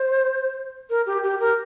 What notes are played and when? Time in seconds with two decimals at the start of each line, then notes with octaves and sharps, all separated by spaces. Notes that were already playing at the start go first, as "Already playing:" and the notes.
Already playing: C5
0.90 A#4
1.06 G4
1.23 G4
1.40 A#4